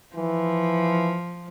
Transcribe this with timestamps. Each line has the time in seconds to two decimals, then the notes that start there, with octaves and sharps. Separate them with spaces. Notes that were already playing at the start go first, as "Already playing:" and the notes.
0.16 E3 F3